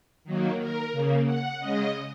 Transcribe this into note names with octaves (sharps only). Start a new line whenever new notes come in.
D#3 F#3 A#3
A#4
C#3 A#3
F#5
C#3 G#3 D#5